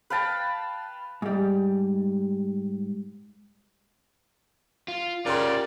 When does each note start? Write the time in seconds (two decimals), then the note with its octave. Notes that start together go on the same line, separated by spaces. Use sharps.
0.10 B4 F5 G5 A5
1.22 G#2 G3
4.88 F4
5.26 C#3 F4 G4 A#4 D5 G5 C6